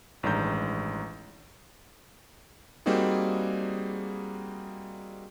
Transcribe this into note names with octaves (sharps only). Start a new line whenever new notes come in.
A1 G2 D#3 G#3 A#5 G6
G3 A#3 C4 D#4 F#4 G#4